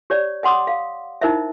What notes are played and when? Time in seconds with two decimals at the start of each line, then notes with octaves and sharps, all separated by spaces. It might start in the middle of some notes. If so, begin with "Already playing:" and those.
0.10 G4 C#5 D5
0.43 D#5 F#5 C6 D6 D#6
0.67 F5
1.21 D#4 E4 A#4 C5 D#5 E5